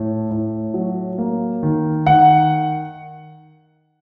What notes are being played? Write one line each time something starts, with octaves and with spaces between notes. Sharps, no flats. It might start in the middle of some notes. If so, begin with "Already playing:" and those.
Already playing: A2
A2
F#3
A#3
D#3
D#3 F#5